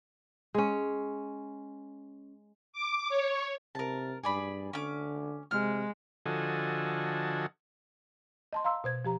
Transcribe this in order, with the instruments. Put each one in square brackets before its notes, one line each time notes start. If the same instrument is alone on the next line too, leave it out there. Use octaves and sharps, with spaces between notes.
[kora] G#3 C#4
[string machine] D6
C#5
[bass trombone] C3 [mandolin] A#4 A5
[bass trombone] G2 [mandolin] G#4 D5 B5
[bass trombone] D3 [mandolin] C#4 D6
[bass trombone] C3 [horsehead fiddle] G#3 [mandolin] F6
[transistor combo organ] D3 F3 F#4 A4 D#5 G#5
[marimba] D#5 A5 C6
F5 A#5 C6 E6
B2 C5 G#6
F3 G4 A#5